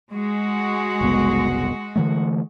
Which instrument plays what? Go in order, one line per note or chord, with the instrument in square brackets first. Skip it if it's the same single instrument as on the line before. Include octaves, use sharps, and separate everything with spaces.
[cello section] G#3 F#4
[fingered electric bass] F#1 C2 B3
D3 E3 A3